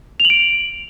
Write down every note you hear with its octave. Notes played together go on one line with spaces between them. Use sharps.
F7
F#7
D7